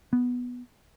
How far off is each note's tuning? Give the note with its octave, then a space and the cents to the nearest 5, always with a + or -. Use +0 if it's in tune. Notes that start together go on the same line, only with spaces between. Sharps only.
B3 -5